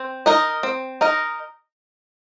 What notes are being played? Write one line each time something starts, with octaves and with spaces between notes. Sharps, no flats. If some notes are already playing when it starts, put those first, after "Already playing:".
Already playing: C4
D#4 A#4 D#5
C4
D#4 A#4 D#5